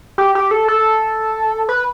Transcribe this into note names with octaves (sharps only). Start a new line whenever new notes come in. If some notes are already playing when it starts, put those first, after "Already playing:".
G4
G4
A4
A4
B4